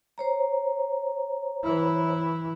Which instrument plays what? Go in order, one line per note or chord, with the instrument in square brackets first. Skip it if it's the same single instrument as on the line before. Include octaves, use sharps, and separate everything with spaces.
[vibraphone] C5 C#5 A#5
[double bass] E3 E4